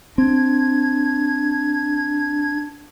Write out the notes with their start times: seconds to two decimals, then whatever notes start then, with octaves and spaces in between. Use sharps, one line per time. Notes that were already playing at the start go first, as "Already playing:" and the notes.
0.18 C4 D4 G#6